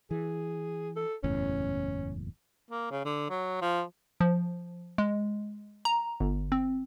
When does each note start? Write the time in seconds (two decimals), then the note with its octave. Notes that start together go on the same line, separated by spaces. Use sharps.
0.11 E3 G#4
0.96 A4
1.24 F#1 E2 A2 C#4
2.71 A#3
2.91 C#3
3.05 D3
3.30 F#3
3.62 F3
4.21 F3
4.98 G#3
5.85 A#5
6.20 G1
6.52 C4